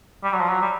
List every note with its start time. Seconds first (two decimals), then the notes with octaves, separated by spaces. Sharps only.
0.24 G3
0.33 F#3
0.41 F3
0.50 F#3
0.61 G3